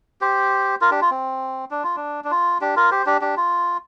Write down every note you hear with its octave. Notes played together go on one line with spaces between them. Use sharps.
G4 C5
F4 A#4
D4 G4
F4
C4
D4
F4
D4
D4
F4
D4 G4
F4 A#4
G4 C5
D4 G4
D4 G4
F4